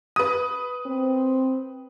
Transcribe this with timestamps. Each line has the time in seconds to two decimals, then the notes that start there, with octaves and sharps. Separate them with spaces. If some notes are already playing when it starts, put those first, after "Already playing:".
0.16 B4 D#6
0.86 C4